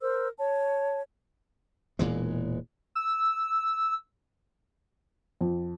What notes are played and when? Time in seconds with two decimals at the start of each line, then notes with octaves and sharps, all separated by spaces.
0.01 A#4 C5 E6
0.37 C#5 A5
1.99 E1 A#2 E3 G#3
2.95 E6
5.41 F2